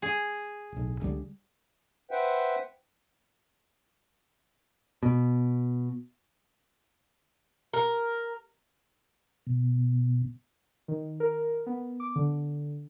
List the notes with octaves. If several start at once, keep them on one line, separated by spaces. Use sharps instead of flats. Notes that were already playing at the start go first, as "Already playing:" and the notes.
G#4
D1 B1
C#2 D3 G3
B4 C5 E5 F#5 G5
B2
A#4
B2
D#3
A#4
B3
D6
D3